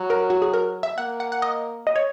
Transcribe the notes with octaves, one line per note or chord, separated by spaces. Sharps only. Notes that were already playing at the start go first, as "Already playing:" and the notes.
Already playing: F#3
A#4
F#4
G#4
A#4
E5
A#3 F#5
F#5
F#5
D#5
D#5
C#5